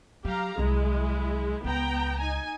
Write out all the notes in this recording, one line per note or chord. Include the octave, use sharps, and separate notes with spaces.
F#3 G4 F5 A#5
C2 F#3 G#3 E4
C#2 B3 G5 A#5
D#4 G#5